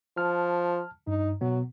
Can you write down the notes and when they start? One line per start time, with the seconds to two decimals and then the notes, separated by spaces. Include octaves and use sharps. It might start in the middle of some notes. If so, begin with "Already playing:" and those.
0.18 F3 A5 F6
1.07 G2 D#4
1.41 B2 F#3 B3